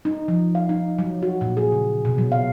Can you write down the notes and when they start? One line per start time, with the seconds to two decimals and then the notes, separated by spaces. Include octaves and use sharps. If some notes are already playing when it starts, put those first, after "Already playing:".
0.05 D#4
0.28 F3
0.55 F5
0.69 D#4
0.99 F#3
1.23 F#4
1.41 A#2
1.57 G#4
1.72 C#3
2.05 B2
2.18 F#3
2.32 F5